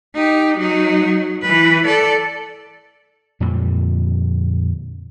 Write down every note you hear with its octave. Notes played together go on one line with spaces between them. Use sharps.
D#4 G4
F#3 D#4
F#3
E3 B4
A4 D5
F2 A#2 D3 G3